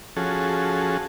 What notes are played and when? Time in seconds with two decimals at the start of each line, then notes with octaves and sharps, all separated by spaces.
0.16 F3 C#4 F#4 G#4 A4